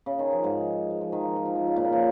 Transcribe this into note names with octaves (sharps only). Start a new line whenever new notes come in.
C#3
D#3
F3
G#2 G#3
G#3
F3
D#3
F3
F3
D#3
F3
C#3
A#2
C#3
F3